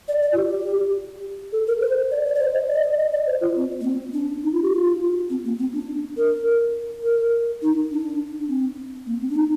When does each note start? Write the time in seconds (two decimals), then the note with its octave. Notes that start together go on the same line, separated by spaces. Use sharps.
0.08 D5
0.22 D5
0.32 F4
0.37 G4
1.53 A4
1.67 A#4
1.81 C5
2.11 D5
2.25 D5
2.35 D5
2.40 C5
2.54 D#5
2.68 D5
2.76 D#5
2.84 D5
2.98 D#5
3.12 D5
3.26 C5
3.41 F4
3.56 C4
3.81 A#3
3.84 C4
4.13 D4
4.43 D#4
4.53 F4
4.62 G4
4.72 F4
5.30 C4
5.44 A#3
5.59 C4
5.73 D4
6.17 A#4
7.04 A#4
7.62 D#4
7.91 D4
8.48 C4
9.06 A#3
9.21 C4
9.30 D4
9.36 D#4